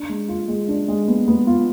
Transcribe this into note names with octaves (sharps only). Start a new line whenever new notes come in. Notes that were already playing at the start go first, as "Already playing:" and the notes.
Already playing: D4
G#3
F4
G#3
D4
G#3
B3
B3
F4